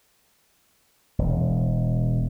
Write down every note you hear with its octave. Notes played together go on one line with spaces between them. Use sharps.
E1